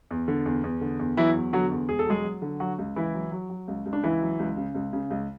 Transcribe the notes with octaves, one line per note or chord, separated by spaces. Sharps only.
E2
D3
E2
E2
D3
E2
E3 F#3 E4
E2
D3 F#3 F#4
E2
E1 G#4
A4
F#3 G#3 G#4
F#3
D3
F#3 F#4
C#2
C#2 E3 E4
F#3
F#3
F#3
C#2
C#2
D4
C#2 E3 E4
F#3
C#2
C#3
C#2
C#3
C#2